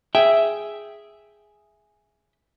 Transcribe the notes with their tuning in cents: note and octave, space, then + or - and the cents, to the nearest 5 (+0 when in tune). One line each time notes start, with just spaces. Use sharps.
G#4 +0 E5 +0 G5 +0